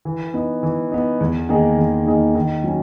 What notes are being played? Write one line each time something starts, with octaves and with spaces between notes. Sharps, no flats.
E3
B3 D#4
E3
B3 D#4
E2
D#3 A#3 D#4 G#4
E2
D#3 A#3 D#4 G#4
D#3
F#3 C#4 F#4